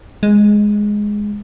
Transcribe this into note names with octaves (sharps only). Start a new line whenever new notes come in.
G#3